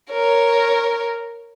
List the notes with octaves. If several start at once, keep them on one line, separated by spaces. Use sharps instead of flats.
A#4 C#5